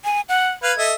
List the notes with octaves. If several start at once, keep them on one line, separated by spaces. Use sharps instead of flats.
G#5
F#5
B4 F5 G#6
A4 D#5 E5